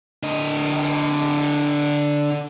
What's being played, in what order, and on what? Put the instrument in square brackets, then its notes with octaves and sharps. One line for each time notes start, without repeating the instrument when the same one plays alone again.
[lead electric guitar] D3 D#5